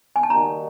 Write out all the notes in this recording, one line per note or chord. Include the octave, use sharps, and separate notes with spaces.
G#5
A5
D#3 G3 A#3 D#4 F#4 A#5